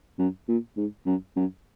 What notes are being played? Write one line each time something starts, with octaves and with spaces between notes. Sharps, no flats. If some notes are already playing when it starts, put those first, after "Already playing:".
F#2
A#2
G#2
F#2
F#2